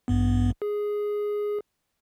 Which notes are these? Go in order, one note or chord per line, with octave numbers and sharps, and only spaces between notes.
A1 G2 B3
G#4